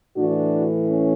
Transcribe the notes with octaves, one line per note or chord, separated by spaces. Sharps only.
A2 E3 D4 F#4
C#4